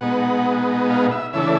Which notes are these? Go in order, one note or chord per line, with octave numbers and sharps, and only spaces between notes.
B2 G#3 B3 D#4 F#5
F5
E5
C#3 E3 A3 D4 E5